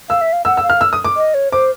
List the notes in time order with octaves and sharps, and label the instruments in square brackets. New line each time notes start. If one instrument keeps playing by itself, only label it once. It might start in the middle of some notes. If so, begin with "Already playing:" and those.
[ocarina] F5 [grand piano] E6
[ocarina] E5
F5
[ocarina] F#5 [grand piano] E6
[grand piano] E6
[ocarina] F5
[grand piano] F6
E6
D#6
D6
[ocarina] D#5
C#5
[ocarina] C5 [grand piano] D6